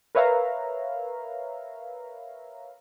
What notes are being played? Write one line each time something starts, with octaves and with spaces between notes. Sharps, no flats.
A#4 B4 C#5 E5 F5 A#5